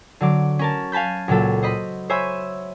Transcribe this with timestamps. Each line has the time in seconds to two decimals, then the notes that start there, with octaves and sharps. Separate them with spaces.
0.21 D3 F#3 D6
0.59 C#4 A#4 A5
0.92 F5 G#5 A5 B5 G6
1.28 C#2 A#2 F#3 A4
1.63 C5 D#5 B5
2.10 C5 C#5 E5 G#5 B5